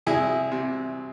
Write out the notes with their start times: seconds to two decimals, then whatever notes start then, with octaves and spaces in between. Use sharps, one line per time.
0.07 C2 E4 G#4
0.52 C3